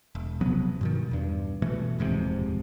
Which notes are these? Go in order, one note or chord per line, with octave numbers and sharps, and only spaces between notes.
E1
C3 F3 F#3 B3
G2 B2 D#3
E2 G2
B2 E3 A3
D#1 F2 G#2 C3